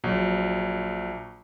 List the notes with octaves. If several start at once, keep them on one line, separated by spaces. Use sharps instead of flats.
A#1 F#3